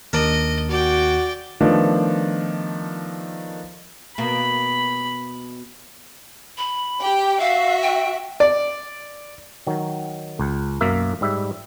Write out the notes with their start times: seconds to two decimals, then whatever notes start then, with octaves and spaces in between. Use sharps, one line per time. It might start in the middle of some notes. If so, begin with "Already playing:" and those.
0.13 D#2 D4 A#4 D#5
0.70 F#4 D5 G5
1.61 D#3 F3 A3 B3 D4
4.18 B2 A#3 B5
6.58 B5
7.00 G4 G5
7.40 F#4 E5 F5
7.82 G5
8.40 D5
9.67 D#3 F#3
10.40 C#2
10.81 B1 F#2 A#3 E5
11.21 G#2 G3 E5